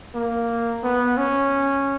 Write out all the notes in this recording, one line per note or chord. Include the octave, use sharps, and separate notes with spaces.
A#3
B3
C#4